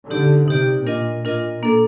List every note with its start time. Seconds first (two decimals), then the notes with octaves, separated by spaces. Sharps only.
0.10 D3 D#4 G4 D5
0.47 C3 D#4 G4 D5
0.86 A#2 D4 F4 A#4 D#5
1.24 A#2 D4 F4 A#4 D#5
1.63 A#3 D4 A4